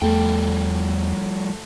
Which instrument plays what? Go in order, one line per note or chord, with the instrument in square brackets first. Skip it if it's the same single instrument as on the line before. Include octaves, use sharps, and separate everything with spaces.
[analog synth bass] E2 [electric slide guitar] F3 G3 G5 [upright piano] A3